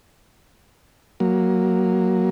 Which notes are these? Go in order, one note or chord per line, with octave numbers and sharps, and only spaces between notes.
F#3 A#3